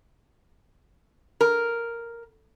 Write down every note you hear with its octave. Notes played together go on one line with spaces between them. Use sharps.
A#4